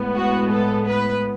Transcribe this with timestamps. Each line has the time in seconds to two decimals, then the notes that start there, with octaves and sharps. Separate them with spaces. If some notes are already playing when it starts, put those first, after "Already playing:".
Already playing: A2 G#3 B3
0.16 F#4
0.51 A4
0.87 B4